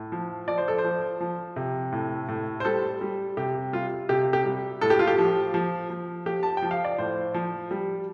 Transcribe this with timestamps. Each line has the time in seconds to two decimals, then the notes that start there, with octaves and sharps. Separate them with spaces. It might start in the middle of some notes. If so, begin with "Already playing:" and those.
Already playing: A2
0.12 F3
0.48 F3 D5
0.58 C5
0.68 A4
0.78 C5
0.84 F3
1.20 F3
1.56 C3
1.92 A2
2.28 A2
2.60 C5
2.65 G3 A4
3.01 G3
3.37 C3 G4
3.73 G3 F4
4.09 C3 G4
4.33 G4
4.45 G3
4.81 A2 A4
4.90 G4
4.99 F4
5.07 G4
5.18 F3
5.54 F3
5.90 F3
6.26 F3 G4
6.43 A5
6.57 G5
6.62 F3
6.71 F5
6.85 D5
6.98 A2 C5
7.34 F3
7.71 G3